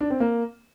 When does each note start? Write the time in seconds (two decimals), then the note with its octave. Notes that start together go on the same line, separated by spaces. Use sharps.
0.01 D4
0.10 C4
0.20 A#3